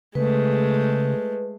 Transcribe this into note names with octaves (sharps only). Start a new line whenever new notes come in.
C#3 G#3 A3 B4